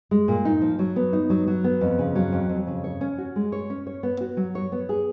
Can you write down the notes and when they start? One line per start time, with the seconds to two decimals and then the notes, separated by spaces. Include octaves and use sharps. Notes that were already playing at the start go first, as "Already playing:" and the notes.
0.11 G#3
0.28 A#2
0.45 D#4
0.61 F3
0.79 F#3
0.96 B3
1.13 D#4
1.30 F#3
1.47 F#3
1.64 B3
1.81 F2
1.99 C#3
2.15 F#3
2.32 F2
2.49 F2
2.67 C#3
2.84 C#5
3.01 C#4
3.18 F#4
3.36 G#3
3.52 C#5
3.70 C#4
3.87 C#5
4.03 B3
4.21 F#4
4.37 F#3
4.55 C#5
4.72 B3
4.89 G#4